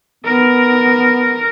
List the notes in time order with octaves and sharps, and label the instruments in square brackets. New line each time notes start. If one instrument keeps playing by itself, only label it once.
[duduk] B3 [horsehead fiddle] A#4